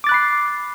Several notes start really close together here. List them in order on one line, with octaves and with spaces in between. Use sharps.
D6 A6 F#6 B5 C7